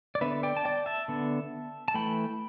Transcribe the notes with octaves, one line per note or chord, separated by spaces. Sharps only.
D5
D3 B3 B4 E5
D5 G5
A5
D5 G5
E5 A5
D3 B3
A5
E3 A3 G5 B5